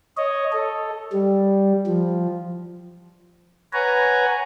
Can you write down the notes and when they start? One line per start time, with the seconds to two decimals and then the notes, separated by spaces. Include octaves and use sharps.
0.17 C#5 D#5
0.52 A4
1.13 G3
1.87 F3
3.73 B4 C#5 F#5 G#5 A#5